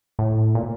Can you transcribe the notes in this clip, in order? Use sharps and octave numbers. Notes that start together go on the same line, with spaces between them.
A2
A#2